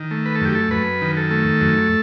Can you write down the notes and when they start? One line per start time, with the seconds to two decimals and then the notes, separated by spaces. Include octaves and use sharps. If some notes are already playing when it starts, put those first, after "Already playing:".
Already playing: D#3
0.11 A3
0.26 B4
0.35 A4
0.41 F#2 G4
0.55 A4
0.71 F#2 B4
1.02 D#3
1.17 A4
1.31 A3
1.61 F#2